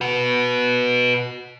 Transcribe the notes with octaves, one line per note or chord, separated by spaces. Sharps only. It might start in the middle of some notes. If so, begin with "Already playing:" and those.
F#4 B4